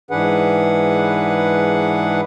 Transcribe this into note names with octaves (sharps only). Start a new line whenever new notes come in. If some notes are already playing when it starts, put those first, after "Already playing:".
G#2 E3 D4 G#4 B4 F#5